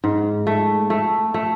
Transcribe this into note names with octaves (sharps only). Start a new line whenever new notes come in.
G#2
A3
A3
A3